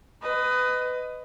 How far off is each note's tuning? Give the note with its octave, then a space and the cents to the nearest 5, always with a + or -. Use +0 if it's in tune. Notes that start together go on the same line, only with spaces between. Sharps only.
B4 +25 D#5 +0